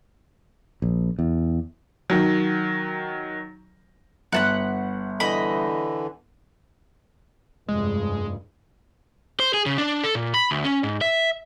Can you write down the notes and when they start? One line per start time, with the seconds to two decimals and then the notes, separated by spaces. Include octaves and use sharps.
0.82 A#1
1.19 E2
2.10 D#3 F#3
4.33 G1 F#5 A5 B5
5.20 D3 E3 D#5 B5
7.68 F1 G2 G#3
9.40 C5
9.54 G#4
9.66 C#3
9.78 D4
10.04 A4
10.15 A#2
10.34 B5
10.51 D2
10.64 C#4
10.83 G#2
11.01 E5